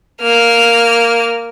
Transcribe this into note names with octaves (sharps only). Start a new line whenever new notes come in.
A#3 F6